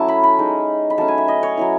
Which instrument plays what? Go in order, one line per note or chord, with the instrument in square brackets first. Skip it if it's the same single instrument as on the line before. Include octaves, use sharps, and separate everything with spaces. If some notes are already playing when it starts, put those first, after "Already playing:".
Already playing: [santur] F#3 A3 C#4 E4 E5 A5
B5
B5
G#3 D#4
B5
F#3 A3 C#4 A5
G#5
E5
D#5
C#5
F#3 C#4 E4